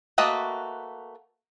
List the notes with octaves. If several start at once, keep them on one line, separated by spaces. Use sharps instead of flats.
A3 A#3 F#4 B4 D#5